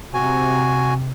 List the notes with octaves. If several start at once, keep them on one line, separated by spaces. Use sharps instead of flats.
C3 F#4 G#5